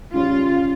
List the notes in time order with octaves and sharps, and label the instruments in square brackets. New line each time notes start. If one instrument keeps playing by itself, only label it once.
[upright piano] C#3 G3 C#4 [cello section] F4